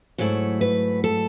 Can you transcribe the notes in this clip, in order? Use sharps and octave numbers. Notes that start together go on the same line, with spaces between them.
G#2 F#3 A3 E4 C#5
B4
A4